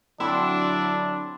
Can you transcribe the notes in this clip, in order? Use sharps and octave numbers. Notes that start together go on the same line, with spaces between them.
D3 F#3 C4 D4 E4 B5